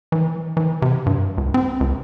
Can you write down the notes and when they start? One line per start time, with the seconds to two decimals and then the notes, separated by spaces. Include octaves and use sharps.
0.12 E3
0.57 E3
0.82 C3
1.06 G2
1.38 C#2
1.54 C4
1.80 C#2